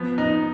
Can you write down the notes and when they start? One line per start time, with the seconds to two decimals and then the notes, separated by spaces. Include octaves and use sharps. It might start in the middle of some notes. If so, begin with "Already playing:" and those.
Already playing: F3 B3
0.18 D#4